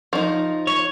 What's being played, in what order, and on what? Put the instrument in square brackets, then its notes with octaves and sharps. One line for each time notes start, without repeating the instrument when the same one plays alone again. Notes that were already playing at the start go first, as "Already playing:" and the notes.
[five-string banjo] F3 D#4
[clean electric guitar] C#5